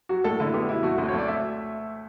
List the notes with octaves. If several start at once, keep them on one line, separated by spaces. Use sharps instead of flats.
F#3 F#4
A2 A4
D3 E4
B3 G4
B2 E4
A3 F#4
D2 F#4
C#5
A3 D5
E5